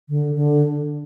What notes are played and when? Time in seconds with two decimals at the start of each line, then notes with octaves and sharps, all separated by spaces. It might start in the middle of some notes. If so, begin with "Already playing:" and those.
0.09 D3
0.35 D3